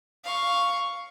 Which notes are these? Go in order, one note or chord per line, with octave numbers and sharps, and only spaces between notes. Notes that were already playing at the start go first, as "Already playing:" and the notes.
F5 C#6